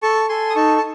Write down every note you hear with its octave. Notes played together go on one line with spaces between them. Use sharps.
A4 A5 C#6
A4 G#5 C6
D#6
D#4 A5 C#6
A5